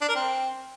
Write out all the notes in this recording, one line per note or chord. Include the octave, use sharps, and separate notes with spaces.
D4
A#4
C4